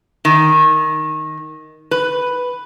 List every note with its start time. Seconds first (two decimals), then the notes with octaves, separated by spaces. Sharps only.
0.25 D#3
1.91 B4